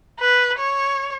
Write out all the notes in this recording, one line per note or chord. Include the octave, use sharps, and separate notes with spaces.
B4
C#5